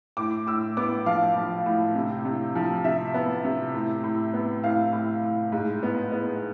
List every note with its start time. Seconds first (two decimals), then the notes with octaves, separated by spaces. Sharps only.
0.17 A2 D6
0.47 A2 E6
0.77 B3 D6
1.06 F3 F5
1.36 F3
1.66 A2
1.95 C3
2.25 C3
2.55 F3
2.84 C3 E5
3.14 B3
3.45 C3
3.74 A2
4.04 A2
4.33 B3
4.64 A2 F5
4.93 A2
5.24 A2
5.52 G#2
5.83 B3
6.12 B3